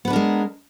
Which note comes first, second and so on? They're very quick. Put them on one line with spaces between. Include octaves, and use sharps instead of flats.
B3 B4 D4 A#4 G#3